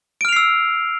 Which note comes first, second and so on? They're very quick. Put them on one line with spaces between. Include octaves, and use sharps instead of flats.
D7 F6 F7 C7 E6